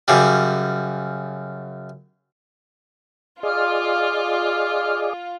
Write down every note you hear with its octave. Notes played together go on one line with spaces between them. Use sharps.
F#2 C#3 G3
F4 G#4 D5 D#5 F6